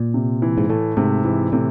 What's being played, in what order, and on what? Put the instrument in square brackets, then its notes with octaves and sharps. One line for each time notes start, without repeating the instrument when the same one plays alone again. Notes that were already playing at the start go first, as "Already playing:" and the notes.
Already playing: [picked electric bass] A#2
[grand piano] C3
E3
[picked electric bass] G#2
[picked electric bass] A2 [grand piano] A3
[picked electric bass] G#2 [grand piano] C3
[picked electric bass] G#2 [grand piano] E3
[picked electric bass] A2 [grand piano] C3